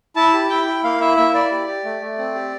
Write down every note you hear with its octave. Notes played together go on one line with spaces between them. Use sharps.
E4 A5
G4
E4 G5
E4
A#3 F5
E4 E5
A#3 E5
E4 D5
G4
G4
A3
A3
C4
G4